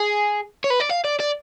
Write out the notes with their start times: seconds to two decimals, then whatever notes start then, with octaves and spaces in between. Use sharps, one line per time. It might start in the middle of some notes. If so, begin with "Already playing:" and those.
Already playing: G#4
0.64 C#5
0.70 B4
0.80 D5
0.90 F5
1.05 D5
1.20 D5